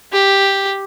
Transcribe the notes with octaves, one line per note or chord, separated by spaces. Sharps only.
G4